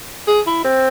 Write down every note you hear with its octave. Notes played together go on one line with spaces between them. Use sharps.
G#4
E4
C4